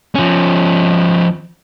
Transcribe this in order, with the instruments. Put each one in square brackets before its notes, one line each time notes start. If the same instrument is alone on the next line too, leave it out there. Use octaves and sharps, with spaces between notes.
[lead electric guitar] F3 C#4